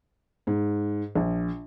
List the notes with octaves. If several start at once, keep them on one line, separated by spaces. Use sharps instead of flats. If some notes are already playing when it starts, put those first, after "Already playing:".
G#2
A#1